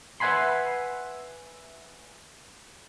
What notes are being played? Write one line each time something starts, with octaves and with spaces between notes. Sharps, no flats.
B4 E5 F#5 G#5 B5 C6